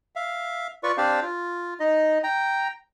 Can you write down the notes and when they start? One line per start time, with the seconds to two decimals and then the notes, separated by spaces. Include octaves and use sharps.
0.16 E5 F5
0.83 F4 B4 D5 C#6
0.98 C4 D4 G4 C5 D5 F5
1.22 F4
1.80 D#4 D#5
2.23 G5 A#5